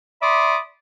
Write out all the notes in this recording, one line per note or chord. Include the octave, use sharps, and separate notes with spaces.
D5 E5 B5 C6 D6 D#6